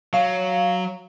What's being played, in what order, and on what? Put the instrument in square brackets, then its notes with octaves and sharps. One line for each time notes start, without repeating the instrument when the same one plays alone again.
[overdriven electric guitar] F#3 [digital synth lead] F5